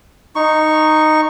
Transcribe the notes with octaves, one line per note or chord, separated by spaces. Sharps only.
D#4 C#6